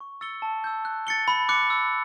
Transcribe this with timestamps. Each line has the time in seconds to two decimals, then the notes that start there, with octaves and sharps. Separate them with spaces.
0.01 C#6
0.21 E6 A6 C#7 G7
0.42 A5
0.64 E6 G6
0.85 F#6
1.07 A6 C#7 G7
1.28 B5
1.49 D6 F#6 C#7
1.70 E6